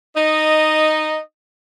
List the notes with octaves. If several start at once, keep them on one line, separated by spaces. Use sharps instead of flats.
D#4 D#5